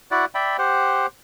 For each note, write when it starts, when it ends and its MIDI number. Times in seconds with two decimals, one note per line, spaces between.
0.11 0.25 64
0.11 0.25 66
0.11 0.25 74
0.11 0.25 78
0.35 0.57 74
0.35 0.57 76
0.35 0.57 79
0.35 0.57 83
0.58 1.06 67
0.58 1.06 72
0.58 1.06 78